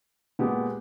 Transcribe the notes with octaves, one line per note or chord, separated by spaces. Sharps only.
A#2 G#3 B3 G4